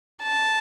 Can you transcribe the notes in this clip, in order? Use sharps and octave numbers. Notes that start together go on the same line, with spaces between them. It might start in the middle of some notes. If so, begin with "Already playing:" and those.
A5